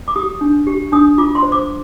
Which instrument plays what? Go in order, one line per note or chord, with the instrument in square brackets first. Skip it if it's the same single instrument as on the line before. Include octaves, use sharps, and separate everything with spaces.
[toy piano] D6
G4 D#6
D4
G4
D4 D#6
F4 D6
C6
C5
D6